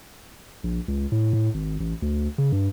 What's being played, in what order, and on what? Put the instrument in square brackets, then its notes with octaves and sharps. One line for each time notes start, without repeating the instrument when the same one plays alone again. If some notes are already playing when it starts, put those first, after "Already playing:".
[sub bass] A#1
C#2
A2
A2
G#1
A1
D2
C#3
G2